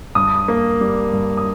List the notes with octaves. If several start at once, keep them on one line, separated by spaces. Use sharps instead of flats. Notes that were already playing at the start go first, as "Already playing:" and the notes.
G2 D#6
A#3
G3
G2
D#6